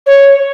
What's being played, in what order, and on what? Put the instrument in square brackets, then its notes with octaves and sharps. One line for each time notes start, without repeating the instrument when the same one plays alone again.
[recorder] C#5